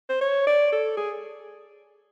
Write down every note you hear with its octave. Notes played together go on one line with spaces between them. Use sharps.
C5
C#5
D5
A4
G#4